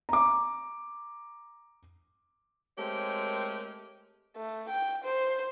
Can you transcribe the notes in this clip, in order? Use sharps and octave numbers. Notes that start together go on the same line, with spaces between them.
A#5 D6
G#3 A3 C4 G4 A#4 C#5
A3
G5
C5